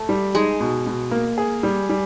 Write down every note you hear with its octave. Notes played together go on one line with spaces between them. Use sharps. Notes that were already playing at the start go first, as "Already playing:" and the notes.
Already playing: A3
G3
G#3 D#4
B2
B2
A#3
G#4
G3
G3